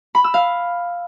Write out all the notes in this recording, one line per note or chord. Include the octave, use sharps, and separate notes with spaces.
B5
E6
F5